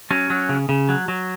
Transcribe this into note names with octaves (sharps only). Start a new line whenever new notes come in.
F#3 C#4
F#3
C#3
C#3
F#3
F#3